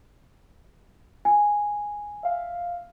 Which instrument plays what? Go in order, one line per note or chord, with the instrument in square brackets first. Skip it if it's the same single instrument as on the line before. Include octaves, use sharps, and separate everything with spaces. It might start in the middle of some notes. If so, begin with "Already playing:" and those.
[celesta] G#5
[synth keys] E5 F5